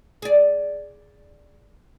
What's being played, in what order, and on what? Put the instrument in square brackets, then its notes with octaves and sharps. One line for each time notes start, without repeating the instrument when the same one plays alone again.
[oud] G#4 D5